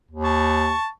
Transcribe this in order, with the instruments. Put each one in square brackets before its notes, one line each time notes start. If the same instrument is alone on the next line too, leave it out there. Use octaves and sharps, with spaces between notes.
[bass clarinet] D#2
[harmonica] A5 C#6